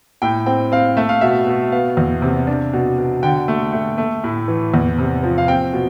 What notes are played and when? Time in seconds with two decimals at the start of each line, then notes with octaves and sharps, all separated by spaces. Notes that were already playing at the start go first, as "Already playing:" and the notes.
0.22 A2 G5
0.46 C4 G5
0.72 C4 F5
0.97 A3 E5
1.09 F5
1.21 B2 E5
1.47 B2
1.72 B3 F5
1.97 E2
2.22 C3
2.47 D4
2.73 B2
2.98 B2
3.23 D3 G5
3.48 A3
3.73 A3
3.98 A3
4.24 A2
4.48 E3
4.74 E2
4.98 C3
5.23 F3
5.38 F5
5.48 C4 G5
5.73 B2